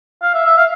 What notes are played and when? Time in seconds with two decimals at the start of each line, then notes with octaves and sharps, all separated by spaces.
0.22 F5
0.34 E5
0.45 E5
0.58 F5